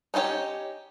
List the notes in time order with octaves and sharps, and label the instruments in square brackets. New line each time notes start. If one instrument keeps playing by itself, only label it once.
[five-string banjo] C#4 D#4 F4 G4 C#5